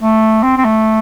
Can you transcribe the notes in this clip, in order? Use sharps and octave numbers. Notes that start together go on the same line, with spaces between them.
A3
C4
C4
A3